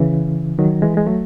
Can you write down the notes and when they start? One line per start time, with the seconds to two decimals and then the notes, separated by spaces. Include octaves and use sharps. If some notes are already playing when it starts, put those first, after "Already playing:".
Already playing: C#3 E3
0.59 D#3 F#3
0.82 E3 G#3
0.97 G#3
1.06 F#3 A3